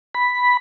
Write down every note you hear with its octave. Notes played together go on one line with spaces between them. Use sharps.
B5